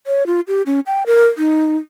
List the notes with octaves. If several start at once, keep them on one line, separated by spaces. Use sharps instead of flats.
C#5
F4
G4
C#4
G5
A#4
D#4